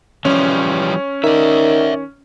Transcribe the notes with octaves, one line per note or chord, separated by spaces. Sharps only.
E3 F3 G3 C#4
D#3 D5 E5